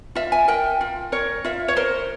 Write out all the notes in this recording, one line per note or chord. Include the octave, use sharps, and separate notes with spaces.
F4 E5
G#5
A#4 G5
F4
A#4 C#5
F4 E5
C#5
A#4 C5